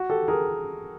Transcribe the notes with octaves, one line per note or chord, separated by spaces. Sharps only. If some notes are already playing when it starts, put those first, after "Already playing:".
Already playing: F#4
G4 A4
G#4 A#4